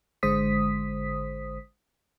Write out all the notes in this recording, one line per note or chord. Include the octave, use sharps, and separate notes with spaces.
G#1 D3 G#3 C5 D#6 B6